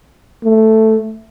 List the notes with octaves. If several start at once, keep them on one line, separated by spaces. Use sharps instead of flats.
A3